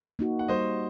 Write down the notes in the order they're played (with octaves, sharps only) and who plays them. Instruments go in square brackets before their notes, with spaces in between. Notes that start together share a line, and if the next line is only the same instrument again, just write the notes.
[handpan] A#3 D#4 F#4
[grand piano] F#5
[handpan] G3 [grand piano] C5 D#5